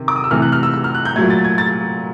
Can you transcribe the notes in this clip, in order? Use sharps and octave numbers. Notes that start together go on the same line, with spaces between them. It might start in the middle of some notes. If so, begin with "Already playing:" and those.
Already playing: C3 D#3
D6
D#6
E6
C3 E3 A3 F6
F#6
F6
E6
E6
F6
F#6
G6
A#2 F#3 A3 G#6
A6
G#6
A6